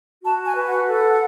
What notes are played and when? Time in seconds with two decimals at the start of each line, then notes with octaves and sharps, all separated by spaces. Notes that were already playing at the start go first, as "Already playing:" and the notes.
0.23 F#4 A5
0.45 G#5
0.56 B4
0.67 F#5
0.88 A4 F#5